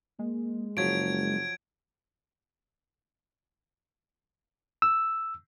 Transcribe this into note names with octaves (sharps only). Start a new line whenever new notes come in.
G#3 A#3
F#1 F3 F#3 G#6 D7
E6